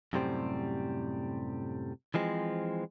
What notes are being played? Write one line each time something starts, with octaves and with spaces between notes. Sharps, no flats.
F#2 A2 C3 G3 C4
E3 F3 G#3 C4